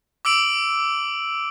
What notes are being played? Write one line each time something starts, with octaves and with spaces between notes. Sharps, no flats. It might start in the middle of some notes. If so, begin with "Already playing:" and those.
D6 E6 D7 F#7